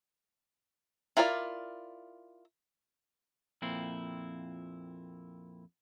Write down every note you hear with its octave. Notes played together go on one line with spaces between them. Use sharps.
E4 F4 A#4 C#5 D5
F2 A#2 C4 E4